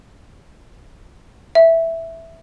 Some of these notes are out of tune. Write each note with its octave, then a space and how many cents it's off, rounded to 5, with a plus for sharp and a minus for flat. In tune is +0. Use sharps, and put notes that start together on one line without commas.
E5 +0